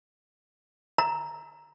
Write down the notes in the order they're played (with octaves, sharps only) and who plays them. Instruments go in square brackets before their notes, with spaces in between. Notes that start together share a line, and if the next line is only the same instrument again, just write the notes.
[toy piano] A#5